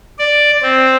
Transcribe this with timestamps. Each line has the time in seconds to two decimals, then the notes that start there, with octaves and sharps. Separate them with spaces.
0.19 D5
0.62 C4